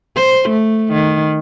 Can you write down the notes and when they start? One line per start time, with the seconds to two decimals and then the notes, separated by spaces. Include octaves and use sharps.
0.16 C5
0.49 A3
0.92 D#3